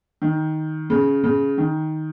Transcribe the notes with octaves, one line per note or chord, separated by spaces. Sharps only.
D#3
C#3
C#3
D#3